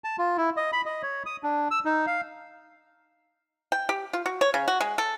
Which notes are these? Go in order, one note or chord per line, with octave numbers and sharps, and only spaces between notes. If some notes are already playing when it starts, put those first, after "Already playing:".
A5
F4
E4
D#5
B5
D#5
C#5
D#6
D4
E6
D#4
F5
G5
G4
F4
F#4
C#5
C#3
F#4
G#3
A4